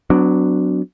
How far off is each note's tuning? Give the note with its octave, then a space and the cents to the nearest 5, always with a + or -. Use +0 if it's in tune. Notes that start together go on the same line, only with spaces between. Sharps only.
F#3 +0 B3 +40 D4 +0